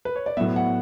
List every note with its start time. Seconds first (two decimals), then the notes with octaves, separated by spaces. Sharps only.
0.05 B4
0.16 C#5
0.26 D5
0.37 A2 F#3 B3 E5
0.56 F#5